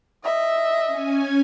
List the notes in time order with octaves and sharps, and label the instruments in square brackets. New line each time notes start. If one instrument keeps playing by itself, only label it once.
[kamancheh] D#5 E5
[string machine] C#4 G#5